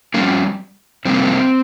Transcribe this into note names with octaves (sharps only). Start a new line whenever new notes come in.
F2 C3 G3 A#3 C#4
F2 C3 G3 A#3 C4